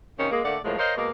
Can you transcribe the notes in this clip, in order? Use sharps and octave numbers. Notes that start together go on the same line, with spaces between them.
C3 D#3 A#3 C4 C#4
G#3 A#3
D3 A3 A#3 D5 F#5
A2 F3 F#3 G#3 A#3
A#4 C5 C#5 D#5 F5
B2 G#3 A#3